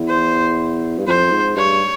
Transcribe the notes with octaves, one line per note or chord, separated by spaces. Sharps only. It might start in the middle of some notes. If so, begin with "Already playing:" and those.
Already playing: E2
C5
G2
F2 C5
G#2
G2 C#5